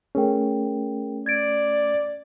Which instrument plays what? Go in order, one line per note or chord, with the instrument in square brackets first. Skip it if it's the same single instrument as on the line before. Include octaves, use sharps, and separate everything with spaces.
[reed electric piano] A3 C#4 [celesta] G#4 A#4 G5
[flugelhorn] D5 [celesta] G#6 A6 D7